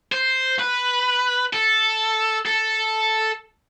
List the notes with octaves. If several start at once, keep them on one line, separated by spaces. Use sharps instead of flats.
C5
B4
A4
A4